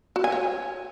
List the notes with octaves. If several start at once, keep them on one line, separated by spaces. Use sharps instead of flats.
F#4
G#5
C#5